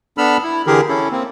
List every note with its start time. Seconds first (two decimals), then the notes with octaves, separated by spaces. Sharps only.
0.18 B3 D4 A4 B5 E6 F6
0.44 E4
0.67 D3 E3 G4 G#4 A#4
0.89 C#4 E4 A4
1.11 A#3 C4